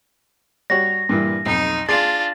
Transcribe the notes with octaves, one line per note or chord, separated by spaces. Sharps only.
G3 F#4 C#5 A#6
G2 A#2 E3
B1 F2 D#4
D4 F4 G#4 D5 C6 A6